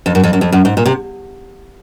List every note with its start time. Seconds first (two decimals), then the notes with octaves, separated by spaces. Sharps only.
0.06 F2
0.15 F#2
0.24 F2
0.33 F#2
0.41 F2
0.52 F#2
0.65 G#2
0.77 A#2
0.86 C3